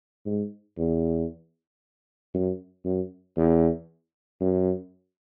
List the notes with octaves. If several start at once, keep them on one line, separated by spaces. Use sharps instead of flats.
G#2
E2
F#2
F#2
E2
F#2